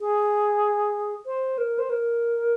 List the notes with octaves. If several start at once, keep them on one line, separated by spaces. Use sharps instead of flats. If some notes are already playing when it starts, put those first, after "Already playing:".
G#4
C5
A#4
C5
A#4